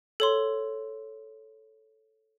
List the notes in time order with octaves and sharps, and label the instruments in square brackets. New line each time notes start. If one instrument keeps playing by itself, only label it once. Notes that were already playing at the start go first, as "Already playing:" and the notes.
[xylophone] A4 C#5 C6